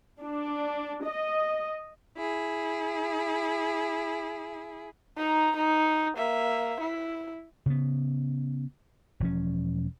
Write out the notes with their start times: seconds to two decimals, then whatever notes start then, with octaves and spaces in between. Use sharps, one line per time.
0.21 D4
1.05 D#5
2.18 E4 G#4
5.17 D#4 A#5
5.56 D#4
6.17 A#3 E5
6.80 E4
7.66 C#3 B3
9.20 E1 F3 C#4